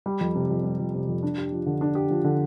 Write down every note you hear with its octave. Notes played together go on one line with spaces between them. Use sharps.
G3
F2
C3
F2
G3
F2
C3
F2
D4
G4
F3
D3
D4
G4
F3
D3